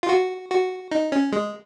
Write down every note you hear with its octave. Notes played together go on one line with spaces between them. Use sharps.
F4
F#4
F#4
D#4
C#4
G#3